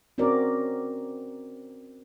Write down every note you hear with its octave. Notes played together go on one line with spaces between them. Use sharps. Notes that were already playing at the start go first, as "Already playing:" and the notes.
C4 C#4 F#4 A#4 D5